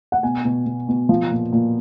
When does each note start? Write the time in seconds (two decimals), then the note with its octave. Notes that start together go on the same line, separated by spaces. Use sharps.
0.12 F#5
0.23 B2 G#5
0.45 B2
0.66 B2
0.89 B2
1.09 F3
1.31 A#2
1.53 A#2